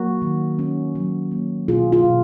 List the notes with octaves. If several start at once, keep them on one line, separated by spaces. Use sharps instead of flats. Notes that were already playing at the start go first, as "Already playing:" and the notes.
Already playing: F#3 A#3 F#4 A#4
D#3
C#4
F#3
A#3
B2 F4 G#4
F4 G#4
B2